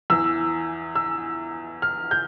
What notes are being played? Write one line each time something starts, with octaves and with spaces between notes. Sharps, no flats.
E2 E3 E6
E6
F6
G6